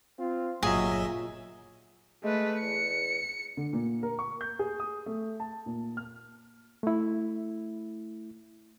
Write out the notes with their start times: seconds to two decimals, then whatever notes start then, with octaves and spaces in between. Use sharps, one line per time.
0.19 C4 F4
0.63 G1 A#2 F#3 G#4 D#5 E5
2.24 G#3 A3 B4
2.62 E2 C#7
3.57 D3
3.73 A#2
4.03 A#4
4.19 C#6
4.41 G6
4.59 G#4
4.80 D#6
5.06 A3
5.40 A5
5.66 A#2
5.97 F6
6.83 A3 E4